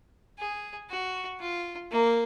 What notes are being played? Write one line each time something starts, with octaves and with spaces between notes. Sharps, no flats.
G#4
F#4
F4
A#3